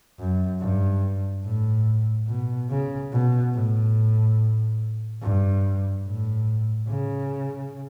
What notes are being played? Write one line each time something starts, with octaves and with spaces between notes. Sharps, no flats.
F#2
G2
A2
B2
C#3
B2
A2
G2
A2
C#3